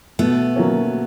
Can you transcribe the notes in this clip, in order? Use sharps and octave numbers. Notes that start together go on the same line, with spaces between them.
B2 A3 B3
F#3 A#3 C#4